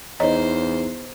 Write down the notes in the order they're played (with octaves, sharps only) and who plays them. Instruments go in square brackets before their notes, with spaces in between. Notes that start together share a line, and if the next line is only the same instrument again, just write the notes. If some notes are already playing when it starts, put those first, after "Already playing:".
[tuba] E2 [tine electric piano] D#4 A#5 [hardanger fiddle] C5 [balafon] C#5 D#5